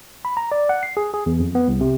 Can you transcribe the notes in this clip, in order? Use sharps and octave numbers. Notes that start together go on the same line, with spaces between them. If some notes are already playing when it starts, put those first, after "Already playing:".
B5
A#5
D5
F#5
C7
G#4
G#4
E2
F2
B3
C2
C3